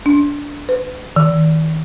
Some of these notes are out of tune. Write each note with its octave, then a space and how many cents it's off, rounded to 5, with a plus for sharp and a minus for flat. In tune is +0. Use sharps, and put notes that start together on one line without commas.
D4 -20
B4 +40
D#3 +35